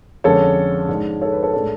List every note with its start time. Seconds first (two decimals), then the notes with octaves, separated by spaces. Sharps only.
0.24 F2 D3 G#3 C#4 A4 C#5
0.89 G#2 G#3 D4
1.22 A4 C#5
1.32 B4
1.43 A4 C#5
1.54 A2 G#3 D4 A4